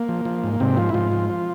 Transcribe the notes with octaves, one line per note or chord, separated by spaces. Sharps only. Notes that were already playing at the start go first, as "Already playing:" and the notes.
Already playing: A#3
F3
F3
G#2
G#2 C3 C4
F3 F4
E4
G#2 F3 F4
F3
F3